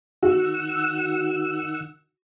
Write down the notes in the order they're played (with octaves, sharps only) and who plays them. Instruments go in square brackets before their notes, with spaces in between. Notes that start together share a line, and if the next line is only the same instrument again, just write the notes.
[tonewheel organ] D#3 F#5 E6 [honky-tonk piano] F#4